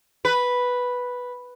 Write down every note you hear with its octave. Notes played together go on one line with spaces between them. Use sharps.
B4